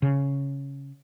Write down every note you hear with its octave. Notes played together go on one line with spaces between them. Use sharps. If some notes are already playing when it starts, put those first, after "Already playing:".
C#3